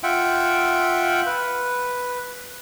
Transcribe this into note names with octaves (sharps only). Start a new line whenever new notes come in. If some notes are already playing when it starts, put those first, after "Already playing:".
F4 E5 F#5 G5
B4